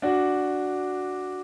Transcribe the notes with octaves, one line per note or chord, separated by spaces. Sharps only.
D4 F#4